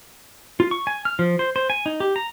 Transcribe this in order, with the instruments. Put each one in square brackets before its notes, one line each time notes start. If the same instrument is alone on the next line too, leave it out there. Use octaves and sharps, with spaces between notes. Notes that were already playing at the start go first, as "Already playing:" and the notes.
[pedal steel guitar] F4
C#6
G#5
F6
F3
C5
C5
G#5
D#4
G4
A#5